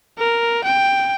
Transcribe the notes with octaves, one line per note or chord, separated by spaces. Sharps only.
A#4
G5